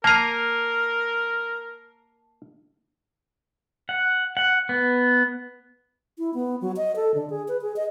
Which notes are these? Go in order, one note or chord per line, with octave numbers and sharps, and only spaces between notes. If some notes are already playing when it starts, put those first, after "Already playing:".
A#3 A#4 A5 A#5 C7 D#7
F#5
F#5
B3
E4
B3
F#3
D#5
A4
D3
G#4
B4
G#4
D#5